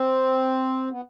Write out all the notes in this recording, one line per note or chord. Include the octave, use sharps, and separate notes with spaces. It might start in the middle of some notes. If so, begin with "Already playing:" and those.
Already playing: C4
B3